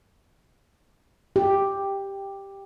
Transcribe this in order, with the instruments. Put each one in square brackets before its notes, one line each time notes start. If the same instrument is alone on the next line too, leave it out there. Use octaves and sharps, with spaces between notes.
[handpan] G4